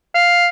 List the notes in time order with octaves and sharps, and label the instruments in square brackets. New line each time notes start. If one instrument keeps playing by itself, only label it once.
[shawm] F5